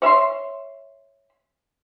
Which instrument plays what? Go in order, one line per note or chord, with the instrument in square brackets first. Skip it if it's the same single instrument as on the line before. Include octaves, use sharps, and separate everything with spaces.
[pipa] C#5 E5 B5 C6